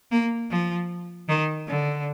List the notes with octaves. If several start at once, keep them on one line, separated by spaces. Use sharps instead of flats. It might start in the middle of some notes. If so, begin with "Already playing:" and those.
A#3
F3
D#3
D3